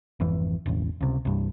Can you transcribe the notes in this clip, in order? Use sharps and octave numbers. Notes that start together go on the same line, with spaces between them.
G#1 F2 E3
E1 A1
C#2 C3
C2 G2